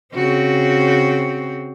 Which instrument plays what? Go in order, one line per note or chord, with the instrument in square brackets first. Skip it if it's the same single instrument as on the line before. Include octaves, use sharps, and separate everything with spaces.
[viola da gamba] C#3 C4 F#4